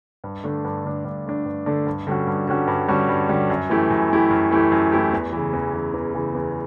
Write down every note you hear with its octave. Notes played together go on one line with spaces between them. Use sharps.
G2
D3 A3 D4
G2
D3 A3 D4
G2
D3 A3 D4
G2
D3 A3 D4
G2
D3 G3 C#4 F#4
G2
D3 G3 C#4 F#4
G2
D3 G3 C#4 F#4
G2
D3 G3 C#4 F#4
F#2
E3 A3 E4 G4
F#2
E3 A3 E4 G4
F#2
E3 A3 E4 G4
F#2
E3 A3 E4 G4
E2
C#3 E3
E2
C#3 E3
E2
C#3 E3
E2